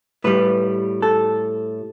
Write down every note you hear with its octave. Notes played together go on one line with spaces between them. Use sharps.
A2 G3 B4
A4